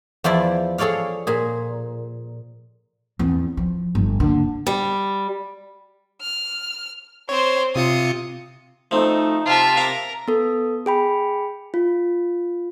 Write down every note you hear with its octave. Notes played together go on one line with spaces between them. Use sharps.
E2 F3 E4 D5 C6
G#4 A4 C#5 D5 F5
A#2 G#4
E2 C4
F3
G1
F#1 D3
G3
F6
C4 C5 C#5
C3 F4 D#6 C#7
F3 A3 C4 D#4
C3 F4 E5 A5
A#4 F5 D6
B3 A4
G#4 G5 B5
F4